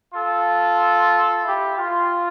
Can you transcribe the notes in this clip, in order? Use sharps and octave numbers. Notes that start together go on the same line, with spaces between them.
F4 A4
E4 G4
F4